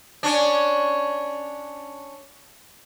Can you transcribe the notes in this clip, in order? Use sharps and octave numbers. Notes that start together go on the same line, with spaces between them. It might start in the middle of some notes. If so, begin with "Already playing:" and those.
C#4 D4